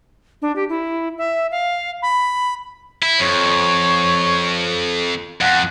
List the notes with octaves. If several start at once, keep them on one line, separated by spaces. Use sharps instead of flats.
D4
G4
E4
E5
F5
B5
E4
F2 C#5
F2 F#5